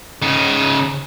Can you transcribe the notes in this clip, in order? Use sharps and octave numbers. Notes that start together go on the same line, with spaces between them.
C#3 D#4